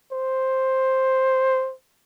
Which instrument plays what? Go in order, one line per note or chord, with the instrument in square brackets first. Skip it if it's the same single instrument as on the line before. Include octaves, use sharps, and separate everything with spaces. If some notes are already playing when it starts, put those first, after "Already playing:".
[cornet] C5